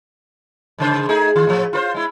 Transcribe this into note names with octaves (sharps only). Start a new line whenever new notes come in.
G#2 C#3 C5
A3 D#4 G#4
D#3 F4
A2 F3
F4 B4 C5
G#3 E4